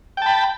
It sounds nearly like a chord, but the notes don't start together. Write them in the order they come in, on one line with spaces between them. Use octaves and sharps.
G5 A5 B5